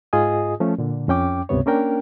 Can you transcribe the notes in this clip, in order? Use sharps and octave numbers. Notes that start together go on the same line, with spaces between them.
G#2 F4 G#4 D#5 G#5 D#6
F3 A3 C#4
A#2 D3
F2 C#4 G5 D6
C#2 G2 C3 B3 C#5
A#3 C#4 D4 A#4 G5